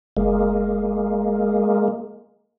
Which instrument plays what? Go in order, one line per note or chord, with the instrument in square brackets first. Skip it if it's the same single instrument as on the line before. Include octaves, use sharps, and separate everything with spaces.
[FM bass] F#1 [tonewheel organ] G#3 A#3